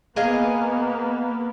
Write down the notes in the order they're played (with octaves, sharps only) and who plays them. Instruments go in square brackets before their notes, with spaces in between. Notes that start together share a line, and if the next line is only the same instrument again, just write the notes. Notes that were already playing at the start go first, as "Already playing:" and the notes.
[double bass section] A#3 B3 [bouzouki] G#4 D#5 F5